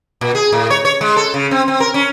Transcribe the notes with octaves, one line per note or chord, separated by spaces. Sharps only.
A#2
G#4
A2
C#5
C#5
G#3
A4
C#3
C4
C4
A#4
C#4